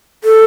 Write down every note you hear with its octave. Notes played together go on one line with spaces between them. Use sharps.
A4